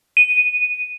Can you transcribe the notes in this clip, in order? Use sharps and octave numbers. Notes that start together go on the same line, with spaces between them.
D#7